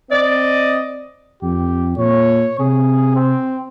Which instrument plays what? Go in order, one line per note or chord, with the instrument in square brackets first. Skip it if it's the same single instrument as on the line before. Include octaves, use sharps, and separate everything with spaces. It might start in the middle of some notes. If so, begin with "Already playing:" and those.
[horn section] C4 D5 D#5
[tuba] F2 [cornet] G4
[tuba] A#2 [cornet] C#5
[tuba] C3 [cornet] G#4
[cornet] C4